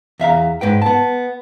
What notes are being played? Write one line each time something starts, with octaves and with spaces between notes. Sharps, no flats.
E2 E5 F5 A#5
G#2 B4 G5
B3 A5